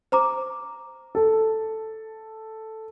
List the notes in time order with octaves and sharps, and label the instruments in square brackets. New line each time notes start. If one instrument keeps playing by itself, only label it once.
[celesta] C5 A#5 D6
[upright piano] A4